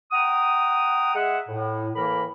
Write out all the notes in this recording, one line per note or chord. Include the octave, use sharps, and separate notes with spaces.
F#5 G5 A#5 D#6
G#3 G#4 E5 F#5
A2
A2 E3 A#3 A#4 B5